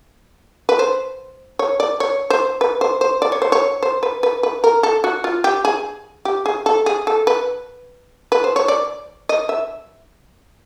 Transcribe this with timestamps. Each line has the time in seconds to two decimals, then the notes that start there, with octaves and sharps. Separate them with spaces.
0.69 B4
0.79 C5
1.59 C#5
1.80 D5
2.00 C#5
2.30 C5
2.61 B4
2.81 C5
3.01 C5
3.22 D5
3.32 C#5
3.42 C5
3.52 C#5
3.83 C5
4.03 B4
4.23 B4
4.43 B4
4.64 A#4
4.83 A4
5.04 F#4
5.24 F4
5.44 G4
5.65 G#4
6.25 G4
6.46 G#4
6.66 A4
6.86 G#4
7.07 A4
7.27 B4
8.32 B4
8.44 C5
8.56 C#5
8.68 D5
9.29 D#5
9.49 E5